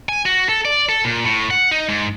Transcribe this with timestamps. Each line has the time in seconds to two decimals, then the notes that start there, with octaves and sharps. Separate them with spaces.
0.09 G#5
0.26 F#4
0.49 A4
0.65 D5
0.89 A4
1.04 A#2
1.25 A2
1.51 F#5
1.71 D#4
1.89 G#2